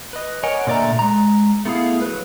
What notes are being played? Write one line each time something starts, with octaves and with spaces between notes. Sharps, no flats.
B4 D#5
A#4 C#5 D#5 F#5 G#5
A#2 D3 A3 D5 E5 A#5
G#3 A#5
A3 B3 E4 F#4 G#4 F5
F#3 B4